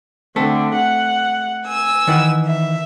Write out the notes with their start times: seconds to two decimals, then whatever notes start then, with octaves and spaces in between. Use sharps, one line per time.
0.36 D3 A3 C4 A4
0.74 F#5
1.67 G#5 E6
2.07 D#3 E3 F#5
2.45 E5